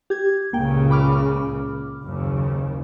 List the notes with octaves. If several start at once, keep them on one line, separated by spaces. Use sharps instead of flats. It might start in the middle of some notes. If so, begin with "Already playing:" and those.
G4 G#6
C#2 A#2 C#3 A#3 G5
B5 D6 F6
F#1 D#2 C#3